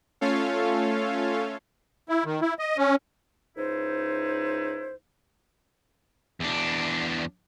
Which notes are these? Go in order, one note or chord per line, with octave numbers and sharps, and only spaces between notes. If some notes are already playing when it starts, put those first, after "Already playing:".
A3 C#4 F4 A4 C#5 F5
E4
D#3
E4
D#5
C#4
C#2 D#4 E4 C5
E2 D4